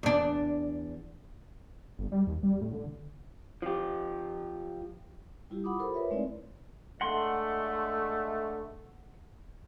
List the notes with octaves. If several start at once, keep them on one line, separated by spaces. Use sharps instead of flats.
E2 D4
G1
G3
D#2
G3
A2
D3
F3 G4
G3 E4 F4 G4
F#5 B5 D6 D#6
F4 G4 A4 A#4 C5 B5
A#4 B4 C#5 E5
G#3 A3 C4 D#4 E4 D5
D3 G#3 A3 F#5 C6